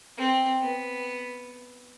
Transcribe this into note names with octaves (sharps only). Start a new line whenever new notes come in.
C4
B3